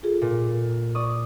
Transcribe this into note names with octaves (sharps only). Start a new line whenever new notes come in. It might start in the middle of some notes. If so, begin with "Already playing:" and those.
F4 G#4 A4
A#2
D5 C#6 D#6